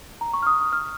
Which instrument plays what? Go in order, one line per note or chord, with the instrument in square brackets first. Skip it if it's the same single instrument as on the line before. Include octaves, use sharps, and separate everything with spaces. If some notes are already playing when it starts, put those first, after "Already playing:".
[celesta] A#5
C#6
F6
D#6
D#6
F6